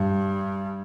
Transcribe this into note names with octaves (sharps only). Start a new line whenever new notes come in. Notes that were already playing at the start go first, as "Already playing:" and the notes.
Already playing: G2